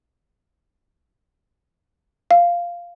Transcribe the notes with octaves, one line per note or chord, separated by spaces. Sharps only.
F5